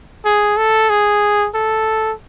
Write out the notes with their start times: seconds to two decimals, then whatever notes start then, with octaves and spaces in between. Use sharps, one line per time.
0.25 G#4
0.57 A4
0.90 G#4
1.55 A4